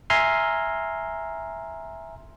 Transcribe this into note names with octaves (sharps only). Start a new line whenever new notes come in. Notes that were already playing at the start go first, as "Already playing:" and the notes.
E5 G#5 A#5 C6 F6